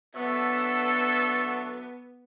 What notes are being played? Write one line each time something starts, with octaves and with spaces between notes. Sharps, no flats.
D3 F#3 B3 D4 A4 E5